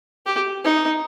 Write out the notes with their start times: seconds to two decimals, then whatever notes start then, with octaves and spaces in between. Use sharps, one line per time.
0.26 G4
0.64 D#4